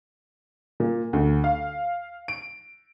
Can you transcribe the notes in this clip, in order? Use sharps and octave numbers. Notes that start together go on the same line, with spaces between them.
A#2
D2
F5
D7